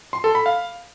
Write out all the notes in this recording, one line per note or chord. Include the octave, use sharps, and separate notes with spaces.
C6
A4
B5
F5